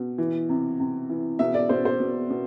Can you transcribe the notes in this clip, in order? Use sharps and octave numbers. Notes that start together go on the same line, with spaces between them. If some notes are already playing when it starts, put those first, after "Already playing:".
Already playing: B2
E3
C3
C3
E3
B2 E5
D5
B2 C5
C5
B2
B2